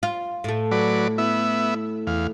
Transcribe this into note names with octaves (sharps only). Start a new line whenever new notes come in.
F4
A2 A3
F#3 B4 D5
B3 E4 E5
E2 F5